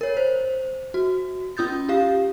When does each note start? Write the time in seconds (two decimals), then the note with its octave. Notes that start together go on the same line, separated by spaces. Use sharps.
0.01 A#4 C#5
0.17 C5
0.94 F#4
1.57 C#4 F4 D#6 G6 A6
1.89 F4 G4 F5